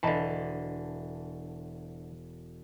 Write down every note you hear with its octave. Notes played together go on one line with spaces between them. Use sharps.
E1 D3 E3 D#5 A5 B5